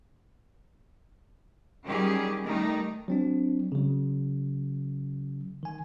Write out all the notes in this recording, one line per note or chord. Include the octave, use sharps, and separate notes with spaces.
D#3 F#3 G3 C#4 G4 G#4
D#3 G3 A3 D#4
F#3 C4 D4
C#3 F#3
D#3 G#5